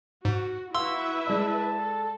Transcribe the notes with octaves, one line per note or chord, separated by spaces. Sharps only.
G#2 F#4
E4 F#4 B4 E5 F5 C6 E6
G#3 D5 A5
A4